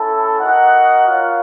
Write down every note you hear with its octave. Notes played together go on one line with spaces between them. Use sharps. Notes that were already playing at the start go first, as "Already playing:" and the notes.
Already playing: C#4 E4 A4
D#4 F#4 A#4 D#5 F#5
F4 A#4 C#5 F5